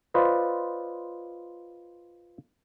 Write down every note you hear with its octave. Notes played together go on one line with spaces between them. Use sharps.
F4 B4 C5 D5 D#5